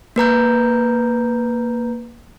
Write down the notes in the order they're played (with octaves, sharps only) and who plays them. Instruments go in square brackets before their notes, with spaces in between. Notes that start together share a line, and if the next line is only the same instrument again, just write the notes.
[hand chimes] A#3 B4 A#5 G6